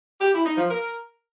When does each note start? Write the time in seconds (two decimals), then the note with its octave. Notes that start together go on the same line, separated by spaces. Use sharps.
0.21 G4
0.33 E4
0.45 D#4
0.57 F3
0.69 A#4